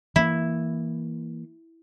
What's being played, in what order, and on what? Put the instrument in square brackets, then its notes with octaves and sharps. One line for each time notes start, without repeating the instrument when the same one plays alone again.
[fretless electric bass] E3 A#3 [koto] E4